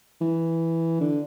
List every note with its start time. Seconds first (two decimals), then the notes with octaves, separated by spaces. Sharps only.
0.21 E3
1.01 D3